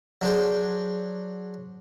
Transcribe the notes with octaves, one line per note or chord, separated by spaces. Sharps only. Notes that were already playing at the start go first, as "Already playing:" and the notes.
F#3 D4 G#4 C5